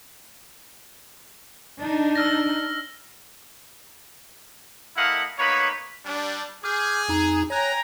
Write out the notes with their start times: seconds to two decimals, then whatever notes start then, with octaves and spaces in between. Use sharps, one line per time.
1.78 D4 D#4
2.16 E6 F6 A#6
4.97 A3 E4 A#4 D#5 F5 F#5
5.39 A#3 B3 D#4 B4 C#5 B5
6.05 G3 D4
6.64 G#4 D6 F6 G6
7.08 F2 D#4 A#5
7.50 C#5 G5 G#5 A#5 F#6